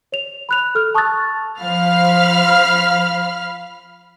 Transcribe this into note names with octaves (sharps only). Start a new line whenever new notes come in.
C#5 F7
B5 F#6 F7
A4 F6
A5 C#6 D#6 E6 F#6 A6
F3 C5 F5 B5 F6